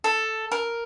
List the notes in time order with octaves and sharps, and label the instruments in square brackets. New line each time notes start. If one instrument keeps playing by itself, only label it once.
[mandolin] A4
A#4